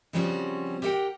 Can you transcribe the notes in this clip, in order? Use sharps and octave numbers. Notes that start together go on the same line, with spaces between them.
C#3 F3 G3 C4 C#4 F#4
G4 A#4 D#5 E5 F#5 G5